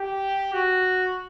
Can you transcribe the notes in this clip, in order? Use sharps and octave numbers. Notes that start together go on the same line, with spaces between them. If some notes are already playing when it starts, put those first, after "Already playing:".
Already playing: G4
F#4